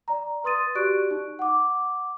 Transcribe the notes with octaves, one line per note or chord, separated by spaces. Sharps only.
D5 A#5
B4 C6 D#6 A6 D#7
F#4 G4 D5 C#6 F#6 D7
D#4
F#5 D6